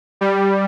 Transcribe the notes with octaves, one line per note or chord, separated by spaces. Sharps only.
G3